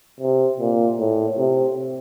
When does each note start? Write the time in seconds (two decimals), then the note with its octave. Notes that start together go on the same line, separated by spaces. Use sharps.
0.20 C3
0.60 A#2
0.99 A2
1.38 C3